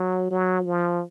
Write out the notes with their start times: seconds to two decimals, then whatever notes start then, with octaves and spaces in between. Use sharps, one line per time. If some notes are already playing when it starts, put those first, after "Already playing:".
Already playing: F#3
0.31 F#3
0.66 F3